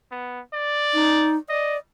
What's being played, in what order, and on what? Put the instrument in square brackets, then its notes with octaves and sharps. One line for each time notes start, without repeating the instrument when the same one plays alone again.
[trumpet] B3
D5
[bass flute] D#4
[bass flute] D5 [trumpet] D#5